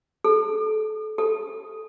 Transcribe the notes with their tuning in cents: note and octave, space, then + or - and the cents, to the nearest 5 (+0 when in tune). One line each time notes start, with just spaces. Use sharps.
A4 -30
A4 -5